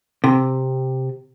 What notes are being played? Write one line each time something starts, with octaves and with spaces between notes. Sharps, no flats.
C3